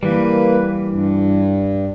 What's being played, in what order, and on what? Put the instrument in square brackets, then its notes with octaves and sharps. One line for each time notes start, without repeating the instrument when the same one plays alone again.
[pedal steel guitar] E3 G3 [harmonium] A#3 B4
[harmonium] G2